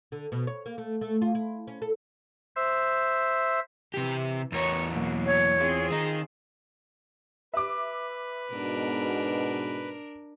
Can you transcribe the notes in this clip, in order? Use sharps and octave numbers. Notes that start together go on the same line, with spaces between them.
D3
B2
C#5
A#3
A3
A3
F4
E4
C#4
A4
C5 E5
C3 E3 G4
E2 B3 A#4 C#5
B2 F#3 A#3
C#5
C4 F4 G#4
D#3 D#4
B4 E5 D6
G#2 B2 D4 A#4